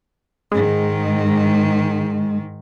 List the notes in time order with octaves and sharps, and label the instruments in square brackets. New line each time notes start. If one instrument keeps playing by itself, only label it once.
[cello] G#2 D#3 [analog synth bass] G#3